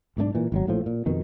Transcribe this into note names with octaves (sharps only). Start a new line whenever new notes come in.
B1 G#2 D#3 D4
A#2 E3
G#1 D3 F#3
A#1 A2 F3
A#2
F2 B2 D#3